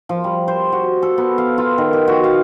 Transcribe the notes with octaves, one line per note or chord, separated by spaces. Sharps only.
F3
G3
C5
F#4
A4
B3
F5
F4
D#3
G4
F#4
F5